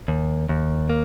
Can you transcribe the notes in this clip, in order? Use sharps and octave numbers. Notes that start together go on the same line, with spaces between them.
D#2
D#2
A#3